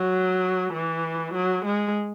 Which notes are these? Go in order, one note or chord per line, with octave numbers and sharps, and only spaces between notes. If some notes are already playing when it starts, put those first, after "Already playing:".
Already playing: F#3
E3
F#3
G#3